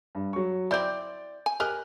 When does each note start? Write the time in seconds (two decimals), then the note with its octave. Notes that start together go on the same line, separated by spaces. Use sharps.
0.15 G2
0.33 F#3 C#6
0.71 C4 E4 D5 D6 G6
1.46 G#5
1.60 G4 A#4 D#5 G#5 F6 F#6